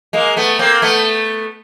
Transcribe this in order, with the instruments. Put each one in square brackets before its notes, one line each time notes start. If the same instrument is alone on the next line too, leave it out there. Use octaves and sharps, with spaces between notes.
[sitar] G#3 A#3
A3 B3
A#3 C4
A3 B3